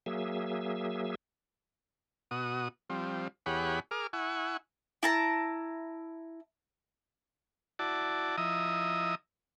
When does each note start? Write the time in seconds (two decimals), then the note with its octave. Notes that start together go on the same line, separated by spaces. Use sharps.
0.06 F#3 A#3 G#4 E5
2.31 B2 F#4 D#6
2.90 F3 G3 C4
3.46 E2 G4 G#4 C#5 F#5 B5
3.91 G#4 A#4 D6 F6
4.13 E4 F#5 G#5 C#6
5.03 E4 A5 A#5
7.79 E4 F#4 D5 A5
8.37 F3 E4 D#5 E5 A#5 D#6